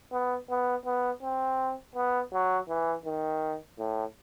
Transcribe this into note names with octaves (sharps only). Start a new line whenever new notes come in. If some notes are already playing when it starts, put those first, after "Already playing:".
B3
B3
B3
C4
B3
F#3
E3
D#3
A2